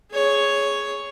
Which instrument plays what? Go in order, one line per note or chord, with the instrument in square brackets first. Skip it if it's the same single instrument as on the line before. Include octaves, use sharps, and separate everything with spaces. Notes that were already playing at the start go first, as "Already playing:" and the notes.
[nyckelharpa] G#4 C#5